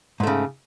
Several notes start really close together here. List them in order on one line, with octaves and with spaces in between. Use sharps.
G#2 A3 C#3